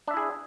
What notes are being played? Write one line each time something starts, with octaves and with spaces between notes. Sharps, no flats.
D4 E4 G#4 E5